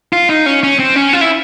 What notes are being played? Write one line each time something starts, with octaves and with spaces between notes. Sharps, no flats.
F4
D#4
C#4
C#4
C4
C#4
F4
E4